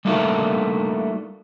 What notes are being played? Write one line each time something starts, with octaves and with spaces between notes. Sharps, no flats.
G3 A3 A#3 D4 D#4 F#4